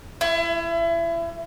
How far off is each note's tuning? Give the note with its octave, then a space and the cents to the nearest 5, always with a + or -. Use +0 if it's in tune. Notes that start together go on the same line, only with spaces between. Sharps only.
E4 +30